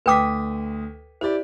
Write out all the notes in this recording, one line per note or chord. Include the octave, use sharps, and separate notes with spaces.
D2 B4 G5 D6 D#6 B6
E4 G4 C5 D5